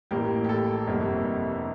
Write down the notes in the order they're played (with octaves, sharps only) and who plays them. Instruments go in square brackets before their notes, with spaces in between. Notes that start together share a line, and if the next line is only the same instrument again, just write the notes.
[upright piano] A1 A2 G3 A#3 G4
G4
A4
G1 F2 C3 G3 A#3